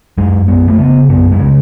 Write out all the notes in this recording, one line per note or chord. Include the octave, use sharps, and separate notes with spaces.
F#2 G#3
F#2 B3
A3
C#3 B3
F#2 B3
G#3
C#3